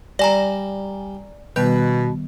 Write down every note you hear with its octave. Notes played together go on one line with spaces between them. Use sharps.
G3 D5 G#5 A#5
B2 D#3 G3 B3 B4